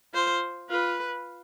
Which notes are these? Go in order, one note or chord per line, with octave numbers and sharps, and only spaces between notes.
F4 C5
F4 B4